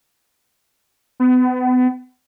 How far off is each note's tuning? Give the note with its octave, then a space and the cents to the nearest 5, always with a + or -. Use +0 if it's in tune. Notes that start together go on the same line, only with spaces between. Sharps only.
B3 +35